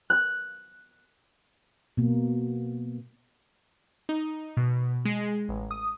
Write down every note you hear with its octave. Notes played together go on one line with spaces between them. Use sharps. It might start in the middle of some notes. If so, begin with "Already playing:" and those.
F#6
B2 A#3
D#4
B2
G#3
A1
D#6